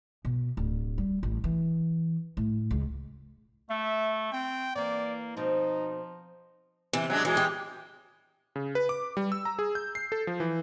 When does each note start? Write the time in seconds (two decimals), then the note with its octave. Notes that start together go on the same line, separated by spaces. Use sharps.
0.25 B2
0.57 D1
0.98 G3
1.23 A1
1.44 E3
2.37 A2
2.71 C#2
3.70 A3 E5
4.33 C4 G5
4.76 E3 A#3 D5
5.37 B2 F3 C4 D#4
6.93 C3 E3
7.10 F#3 G#3 D4
7.25 E3 F#3 G#3
7.37 G4
8.56 C#3
8.75 B4
8.89 D6
9.17 G3
9.32 E6
9.45 A#5
9.59 G#4
9.75 G6
9.95 C7
10.12 A4
10.27 F3
10.40 E3